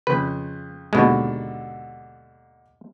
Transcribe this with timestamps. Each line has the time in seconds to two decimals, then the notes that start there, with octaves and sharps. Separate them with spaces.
0.07 F2 C#3 B4
0.93 D#2 G#2 B2 D3 G#3